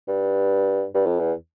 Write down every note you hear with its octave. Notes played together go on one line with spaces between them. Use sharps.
G2
G2
F2
E2